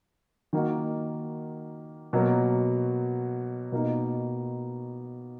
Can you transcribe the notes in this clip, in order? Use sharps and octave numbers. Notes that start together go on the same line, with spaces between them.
D#3 A#3 D#4 F#4
B2 F#3 A#3
B2 A#3 D#4